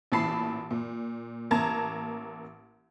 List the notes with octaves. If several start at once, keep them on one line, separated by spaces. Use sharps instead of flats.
A1 A#2 E3 A5 B5 C7
A#2
A1 A#3 A5 A#5 G#6